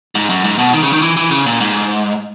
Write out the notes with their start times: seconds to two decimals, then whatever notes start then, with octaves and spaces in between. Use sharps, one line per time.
0.15 G#2
0.30 F#2
0.44 G#2
0.59 B2
0.73 D#3
0.83 C#3
0.93 D#3
1.02 E3
1.17 E3
1.31 C#3
1.46 A#2
1.61 G#2